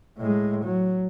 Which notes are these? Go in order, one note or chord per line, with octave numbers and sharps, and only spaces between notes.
A2 G#3
F#3